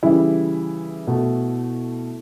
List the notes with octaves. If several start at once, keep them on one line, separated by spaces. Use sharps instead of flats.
C#3 E3 G3 E4
B2 A3